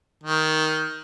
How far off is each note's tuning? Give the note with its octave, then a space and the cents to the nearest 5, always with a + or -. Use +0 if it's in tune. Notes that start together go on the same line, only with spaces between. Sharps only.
D#3 +10